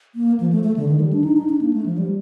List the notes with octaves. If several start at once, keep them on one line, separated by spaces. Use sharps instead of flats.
A#3
F3
A3
A3
D3
D#3
G3
D4
D#4
D#4
D4
A#3
A3
F3
G3